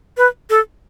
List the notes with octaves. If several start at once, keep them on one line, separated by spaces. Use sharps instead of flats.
B4
A4